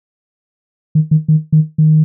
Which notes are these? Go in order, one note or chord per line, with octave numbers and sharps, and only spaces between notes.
D#3
D#3
D#3
D#3
D#3